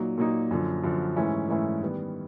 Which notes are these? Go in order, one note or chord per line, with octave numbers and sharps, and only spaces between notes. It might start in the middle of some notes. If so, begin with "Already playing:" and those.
Already playing: A#2 F#3 A#3 D#4
A#2 F#3 A#3 D#4
F#2 D3 F3
F#2 D3 F3
G#2 E3 A3 C#4 E4
G#2 E3 A3 C#4 E4
D#3 G3 B3